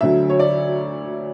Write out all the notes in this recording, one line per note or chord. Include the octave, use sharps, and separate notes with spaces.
D2 D3 F#3 E5
C#5
D5